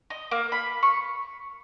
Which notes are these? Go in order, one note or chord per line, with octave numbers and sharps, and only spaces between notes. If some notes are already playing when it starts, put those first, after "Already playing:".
D#5
A#3
B5
C#6